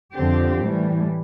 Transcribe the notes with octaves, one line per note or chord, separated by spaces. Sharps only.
F2 D3 F3 C4 G4
A2 E3 G3